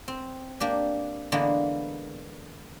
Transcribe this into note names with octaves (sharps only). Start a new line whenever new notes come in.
C4
A#3 D4 G4
D3 E3 G#3 A#3 B3